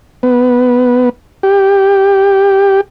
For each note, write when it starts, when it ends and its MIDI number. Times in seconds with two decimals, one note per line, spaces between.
0.23 1.09 59
1.43 2.81 67